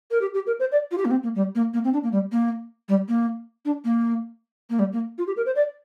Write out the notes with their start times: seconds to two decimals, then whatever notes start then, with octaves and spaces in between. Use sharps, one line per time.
0.11 A#4
0.21 G4
0.34 G4
0.47 A#4
0.60 C5
0.72 D5
0.91 F4
0.98 G4
1.05 A#3
1.11 C4
1.23 A#3
1.35 G3
1.55 A#3
1.73 A#3
1.84 C4
1.93 D4
2.03 A#3
2.12 G3
2.32 A#3
2.88 G3
3.08 A#3
3.65 D4
3.85 A#3
4.70 A#3
4.79 G3
4.92 A#3
5.18 F4
5.27 G4
5.37 A#4
5.46 C5
5.55 D5